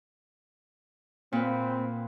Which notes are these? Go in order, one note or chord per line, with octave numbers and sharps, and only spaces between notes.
A#2 C4 B4